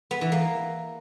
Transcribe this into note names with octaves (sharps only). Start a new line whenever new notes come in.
B3
E3
A#3